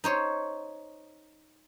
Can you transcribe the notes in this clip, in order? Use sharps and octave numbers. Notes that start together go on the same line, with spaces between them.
D#4 C5 C#5